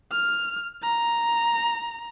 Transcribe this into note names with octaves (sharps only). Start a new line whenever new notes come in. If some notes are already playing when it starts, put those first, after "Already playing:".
F6
A#5